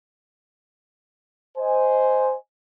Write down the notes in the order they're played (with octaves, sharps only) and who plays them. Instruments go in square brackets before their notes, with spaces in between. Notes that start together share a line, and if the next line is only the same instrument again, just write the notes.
[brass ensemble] C5 D#5 G#5